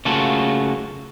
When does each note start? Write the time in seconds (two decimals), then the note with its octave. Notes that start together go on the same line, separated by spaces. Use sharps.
0.05 C#3 A3 A#3 F4 F#4 A4